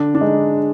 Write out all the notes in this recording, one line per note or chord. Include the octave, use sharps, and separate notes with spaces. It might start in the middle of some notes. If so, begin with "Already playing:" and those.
Already playing: D3 D4
D4
G#3 D#4